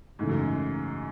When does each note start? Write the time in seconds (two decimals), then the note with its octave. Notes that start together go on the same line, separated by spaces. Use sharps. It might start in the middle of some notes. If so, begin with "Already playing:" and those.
0.19 G#2 C#3 E3 A3 D#4
0.29 F#2